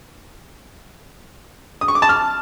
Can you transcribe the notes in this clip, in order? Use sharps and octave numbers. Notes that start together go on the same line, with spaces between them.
D#6
C#6
D6
A5
F6